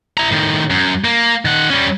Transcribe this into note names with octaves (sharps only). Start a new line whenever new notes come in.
E4 A#5
A2 D#3
F#2
A#3
D#3 F#5
G3 C#4